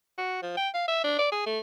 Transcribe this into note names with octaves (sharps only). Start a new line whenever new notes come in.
F#4
F3
G5
F5
E5
D4
D5
G#4
A3